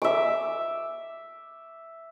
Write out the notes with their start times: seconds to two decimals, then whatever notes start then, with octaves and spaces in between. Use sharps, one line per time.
0.02 E5 D6